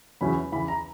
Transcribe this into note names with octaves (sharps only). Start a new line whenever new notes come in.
E2 C#3 F#3 C#4 E4 B5
E2 C#3 E3 B5
A#5